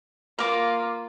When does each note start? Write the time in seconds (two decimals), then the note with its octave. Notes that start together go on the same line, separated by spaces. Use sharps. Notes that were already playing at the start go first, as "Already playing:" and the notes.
0.39 A#3 F4 A#4 D6